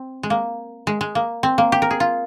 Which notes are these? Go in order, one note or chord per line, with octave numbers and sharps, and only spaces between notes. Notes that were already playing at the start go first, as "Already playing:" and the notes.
Already playing: C4
G#3
A#3
G#3
G#3
A#3
C4
A#3
G4
A#4
G#4
F4